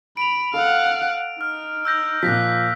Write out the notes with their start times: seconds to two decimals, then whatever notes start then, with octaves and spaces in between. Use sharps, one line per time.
0.17 B5 D7 F7
0.54 A4 F5 F#5
1.41 D#4 F6
1.85 E6 G6 A#6
2.23 A#2 F3 F#6 A#6 B6